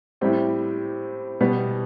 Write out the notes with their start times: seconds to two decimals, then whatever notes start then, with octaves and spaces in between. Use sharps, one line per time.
0.21 A2 G3 C4 G4
1.41 B2 G3 B3